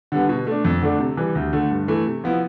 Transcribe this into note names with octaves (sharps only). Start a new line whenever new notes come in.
D3 G3 B3
B2
A3 D4
F2
D3 A3 D4
C3
E3 G3
D2
D3 A3
G2
E3 A3 E4
C3
F3 B3 E4